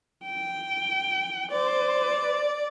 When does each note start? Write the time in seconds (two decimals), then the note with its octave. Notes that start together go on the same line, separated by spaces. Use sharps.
0.25 G5
1.52 C5 D5